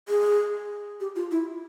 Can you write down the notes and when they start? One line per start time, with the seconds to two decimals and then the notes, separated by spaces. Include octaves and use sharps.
0.08 G#4
1.00 G4
1.16 F4
1.31 E4